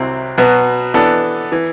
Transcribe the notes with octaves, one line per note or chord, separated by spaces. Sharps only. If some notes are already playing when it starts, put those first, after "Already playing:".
Already playing: C2 C3 F#3 C4 E4
B2 F#3 B3 F#4
E3 B3 D4 A4
E3